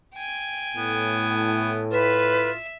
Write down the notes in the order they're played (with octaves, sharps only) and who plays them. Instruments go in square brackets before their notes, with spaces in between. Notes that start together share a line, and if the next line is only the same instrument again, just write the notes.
[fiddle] G5 G#5
[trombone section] A2 [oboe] B3
[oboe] F4 [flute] B4 [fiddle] E5